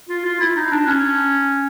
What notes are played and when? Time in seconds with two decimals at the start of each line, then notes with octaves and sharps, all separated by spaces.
0.09 F4
0.25 F4
0.40 E4
0.56 D#4
0.72 D4
0.87 C#4